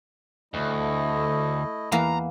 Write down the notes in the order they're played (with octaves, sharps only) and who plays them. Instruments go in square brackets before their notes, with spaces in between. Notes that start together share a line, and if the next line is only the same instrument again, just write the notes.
[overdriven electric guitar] D2 [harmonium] A3 E4 D#5
[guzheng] E2 A#3 [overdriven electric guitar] A#5